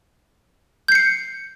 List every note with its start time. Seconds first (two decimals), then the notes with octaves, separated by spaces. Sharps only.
0.88 G6
0.92 C7
0.95 C#7